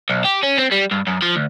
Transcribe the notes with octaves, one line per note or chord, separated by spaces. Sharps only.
B1
G4
C#4
C4
G3
G2
F#2
F3
D2